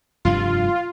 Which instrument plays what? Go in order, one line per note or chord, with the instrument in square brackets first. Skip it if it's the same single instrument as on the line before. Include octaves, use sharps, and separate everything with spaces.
[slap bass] F1 G2 G3 [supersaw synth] F4